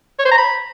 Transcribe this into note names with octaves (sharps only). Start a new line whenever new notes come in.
C#5
C5
A#5
B5